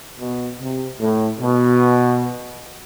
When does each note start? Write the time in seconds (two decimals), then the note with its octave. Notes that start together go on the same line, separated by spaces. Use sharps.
0.19 B2
0.60 C3
1.00 A2
1.41 B2